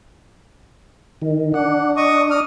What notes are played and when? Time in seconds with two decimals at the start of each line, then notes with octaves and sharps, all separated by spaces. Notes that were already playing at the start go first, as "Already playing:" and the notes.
1.22 D#3
1.54 D4 F#5
1.97 D#5 C#6 D#6
2.31 D#6 F6